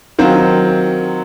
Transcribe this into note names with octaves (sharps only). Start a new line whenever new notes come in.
D#3 F#3 C4 F4